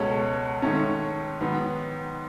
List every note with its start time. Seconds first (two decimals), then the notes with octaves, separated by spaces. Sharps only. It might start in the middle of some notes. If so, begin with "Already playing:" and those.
Already playing: C#2 B2 G#3 C#4 A4 C#5
0.62 G#2 D#3 A3 C#4
1.41 G#2 D#3 F#3 B3